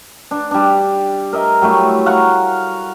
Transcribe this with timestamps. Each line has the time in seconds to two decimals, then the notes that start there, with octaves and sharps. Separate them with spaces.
0.31 D4
0.51 G3 D4
1.33 A#4 D#5 E5
1.62 F#3 G3 A3 E4
2.06 F5 F#5 A#5 C#6